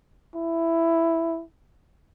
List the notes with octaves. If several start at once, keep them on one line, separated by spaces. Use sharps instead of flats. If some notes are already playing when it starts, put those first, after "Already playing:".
E4